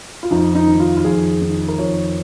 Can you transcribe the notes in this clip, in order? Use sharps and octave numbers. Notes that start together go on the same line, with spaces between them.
F4
F2 D#4
D#4
D#3
F4
F4
F2 G#4
D#3
A#4
F2 C#5